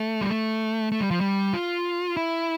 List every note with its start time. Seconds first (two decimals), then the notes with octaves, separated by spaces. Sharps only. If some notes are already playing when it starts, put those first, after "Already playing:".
Already playing: A3
0.21 G3
0.29 A3
0.92 A3
1.01 G3
1.11 F3
1.21 G3
1.53 F4
2.17 E4